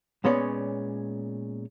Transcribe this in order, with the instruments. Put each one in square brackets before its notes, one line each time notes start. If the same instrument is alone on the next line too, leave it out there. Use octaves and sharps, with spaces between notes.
[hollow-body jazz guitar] A#2 G#3 B3 C#4 C#5 D5